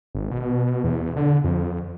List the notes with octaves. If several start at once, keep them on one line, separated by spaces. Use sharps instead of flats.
G#1
B2
E2
D3
F2